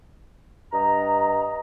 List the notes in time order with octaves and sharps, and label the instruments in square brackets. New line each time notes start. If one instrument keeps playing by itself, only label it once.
[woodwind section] G2 D#5 A#5